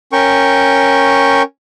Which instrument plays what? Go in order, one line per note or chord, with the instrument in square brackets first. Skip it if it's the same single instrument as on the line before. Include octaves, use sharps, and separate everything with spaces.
[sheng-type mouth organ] C#4 A#4 G5 C#6